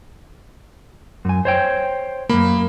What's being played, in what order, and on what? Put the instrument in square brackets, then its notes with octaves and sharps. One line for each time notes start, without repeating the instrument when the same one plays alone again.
[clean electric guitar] F#2 G#5
C5 C#5 G5
[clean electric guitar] C2 F#2 [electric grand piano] A#3 B5